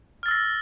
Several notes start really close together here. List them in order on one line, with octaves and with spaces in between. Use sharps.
F6 A6 E6 A#6